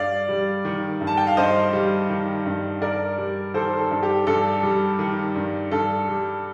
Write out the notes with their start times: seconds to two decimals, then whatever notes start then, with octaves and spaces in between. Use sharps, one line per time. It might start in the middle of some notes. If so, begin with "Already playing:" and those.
Already playing: G2 D5 F5
0.29 G3
0.65 D#3
1.01 G2
1.07 A5
1.17 G5
1.27 F5
1.37 G2 C5 D#5
1.73 G3
2.10 D#3
2.45 G2
2.82 G2 A#4 D5
3.18 G3
3.54 D#3 A4 C5
3.78 A4
3.90 G2
4.03 G4
4.27 G2 A4
4.63 G3
4.99 D#3
5.35 G2
5.71 G2 A4
6.08 G3